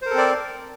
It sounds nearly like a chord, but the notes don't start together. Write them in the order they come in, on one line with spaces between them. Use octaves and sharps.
C5 A#4 A4 C4 D5